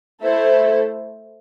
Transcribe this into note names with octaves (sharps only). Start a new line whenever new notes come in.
A3 E4 A4 C5